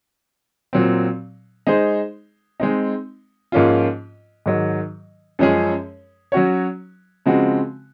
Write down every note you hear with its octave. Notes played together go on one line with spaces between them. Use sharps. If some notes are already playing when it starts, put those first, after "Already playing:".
A#2 F#3 C4
G#3 D#4 G#4 C5
G#3 C4 D#4
G#2 F3 A#3 C#4 F4
G#2 D#3 F#3
F#2 F3 G#3 C#4 G#4
F#3 C#4 F#4 C#5
C#3 F3 G#3 C4 F#4